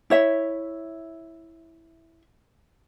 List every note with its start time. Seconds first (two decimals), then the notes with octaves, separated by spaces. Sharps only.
0.10 E4 C#5 E5